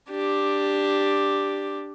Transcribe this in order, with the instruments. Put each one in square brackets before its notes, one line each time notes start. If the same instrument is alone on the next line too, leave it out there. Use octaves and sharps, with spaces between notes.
[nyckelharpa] D4 G4